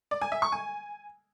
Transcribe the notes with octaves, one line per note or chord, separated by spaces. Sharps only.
D5
G#5
E5
C#6
G#5